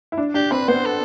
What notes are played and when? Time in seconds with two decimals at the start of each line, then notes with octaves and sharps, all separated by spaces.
0.12 E4
0.18 D4
0.34 D4 G4
0.51 C4 B4
0.68 B3 C5
0.85 A4